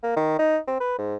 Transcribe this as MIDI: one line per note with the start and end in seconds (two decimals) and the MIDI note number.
0.03 0.12 58
0.16 0.37 51
0.39 0.58 63
0.67 0.76 60
0.80 0.97 71
0.98 1.16 44